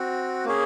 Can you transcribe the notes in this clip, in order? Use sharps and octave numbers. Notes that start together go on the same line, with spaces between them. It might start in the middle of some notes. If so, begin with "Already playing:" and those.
Already playing: C4 F#4
A#3 C#4 G#4